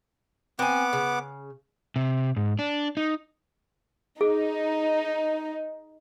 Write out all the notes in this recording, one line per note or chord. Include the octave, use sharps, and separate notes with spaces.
B3 C4 F#5 G#5 D6
C#3
C3
G#2
D4
D#4
D#4 G#4